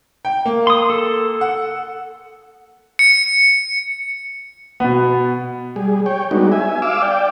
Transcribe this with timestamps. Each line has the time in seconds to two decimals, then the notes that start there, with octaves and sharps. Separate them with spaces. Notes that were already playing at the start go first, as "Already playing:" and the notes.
0.25 G5
0.45 A#3
0.67 C6 D#6
0.90 A4
1.41 F#5
2.99 C#7
4.80 B2 B3
5.76 G3 G#4
6.06 C#5 G5
6.31 G3 G#3 B3 D4 D#4 F#4
6.52 E5 G#5
6.82 F5 D6 E6
7.02 D5 G5